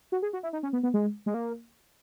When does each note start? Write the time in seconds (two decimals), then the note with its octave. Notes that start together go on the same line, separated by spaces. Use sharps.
0.12 F#4
0.22 G#4
0.33 F#4
0.43 E4
0.53 D#4
0.63 C#4
0.73 B3
0.83 B3
0.94 G#3
1.26 G#3
1.34 A#3